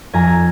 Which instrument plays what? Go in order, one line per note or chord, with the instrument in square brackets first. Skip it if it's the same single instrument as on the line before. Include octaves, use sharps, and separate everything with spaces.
[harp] F2 G#5 A#5